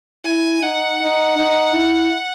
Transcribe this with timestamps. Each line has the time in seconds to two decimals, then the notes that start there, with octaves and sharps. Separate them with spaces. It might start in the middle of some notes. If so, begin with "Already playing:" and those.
0.25 E4 G#5
0.62 D#4 F#5
1.01 D#4
1.38 D#4
1.75 E4